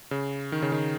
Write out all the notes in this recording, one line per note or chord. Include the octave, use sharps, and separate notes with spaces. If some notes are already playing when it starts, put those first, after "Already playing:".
C#3
D#3
C#3
D#3